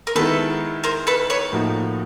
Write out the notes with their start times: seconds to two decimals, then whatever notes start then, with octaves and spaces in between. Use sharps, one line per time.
0.07 A#4
0.15 D#3 G#3 B3 E4 A4 B4
0.84 A#4 C5
1.07 A4 B4
1.30 B4 C#5
1.52 A2 F3 A#3 D#4 F#4